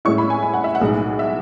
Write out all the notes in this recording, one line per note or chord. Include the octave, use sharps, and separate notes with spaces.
A2 G#3 C#4 E4 C#6
B5
G#5
G#5
F#5
E5
F#5
B1 A2 G#3 D#4
E5